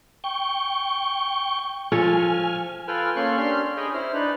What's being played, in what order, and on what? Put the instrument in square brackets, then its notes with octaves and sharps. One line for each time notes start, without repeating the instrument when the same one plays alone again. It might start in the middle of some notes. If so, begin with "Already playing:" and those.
[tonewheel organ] G5 C#6
[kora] F3 A4 C#5 [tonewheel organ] G#5 F6
[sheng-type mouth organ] F4 A4 B4 G5 G#5 F6
A#3 C#4 A4 C6 C#6 F#6
C#4 D4 G4 C6 F6
G#4 C#5 D#5 G5 G#5 B5
E4 C5 F6
D4 D#4 B4